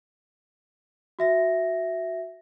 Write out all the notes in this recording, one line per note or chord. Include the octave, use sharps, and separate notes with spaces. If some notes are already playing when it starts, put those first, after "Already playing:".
F#4 E5 A#6